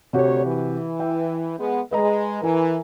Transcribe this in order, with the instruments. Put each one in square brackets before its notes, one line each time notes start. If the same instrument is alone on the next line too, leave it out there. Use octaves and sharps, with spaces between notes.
[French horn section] D2 C#5 [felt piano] C3 F#4 G4
[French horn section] E3
[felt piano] E5 G5
[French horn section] G#3 B3
[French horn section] G#3 [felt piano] B4 D#5 A#5
[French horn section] E3 [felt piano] A#4 G#5 A#5